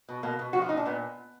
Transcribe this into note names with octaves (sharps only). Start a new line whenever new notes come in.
B2
B2 A#3
B2
F3 F#4
F4
A#2 D#4
D4
A#2 B3